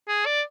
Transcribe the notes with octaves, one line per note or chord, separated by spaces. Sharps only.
G#4
D5